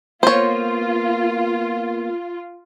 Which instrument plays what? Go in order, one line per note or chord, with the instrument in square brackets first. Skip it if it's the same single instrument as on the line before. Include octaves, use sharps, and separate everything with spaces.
[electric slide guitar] A#3 B3 [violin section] F4 [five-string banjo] C5 C#5